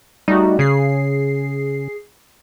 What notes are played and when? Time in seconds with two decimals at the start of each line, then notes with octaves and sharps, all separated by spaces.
0.28 G3 A3 D#4 F#4
0.59 C#3 G#4 C7